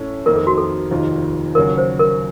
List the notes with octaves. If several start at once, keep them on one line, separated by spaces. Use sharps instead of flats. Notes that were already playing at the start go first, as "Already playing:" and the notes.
Already playing: A2 A3 C#4
F2 D#3 A#3 D#4 A#4
A4
F#4
A4
F1 D#2 D#3 A#3 F4
D#2 C#3 F#3 A#4
C5
A#4